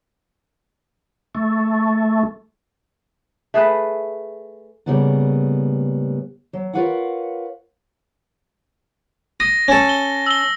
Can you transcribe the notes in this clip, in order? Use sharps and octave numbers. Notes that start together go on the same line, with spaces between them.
A3
A3 G#4 B4
A2 C#3 G3 G#3 A#3 B3
F#3
F4 A#4 B4 C#5 F5 F#5
D#6 A#6
C#4 A4
G7
E6 G7